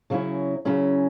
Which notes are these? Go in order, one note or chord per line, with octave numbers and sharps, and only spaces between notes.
C#3 F#3 C#4 E4
C#3 F#3 C#4 E4